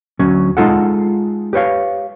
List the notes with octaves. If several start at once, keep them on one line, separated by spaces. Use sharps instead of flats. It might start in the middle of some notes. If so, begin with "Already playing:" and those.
D2 F#3 C#4
G#3 D#4 F4 A4 F#5
G4 B4 C#5 F5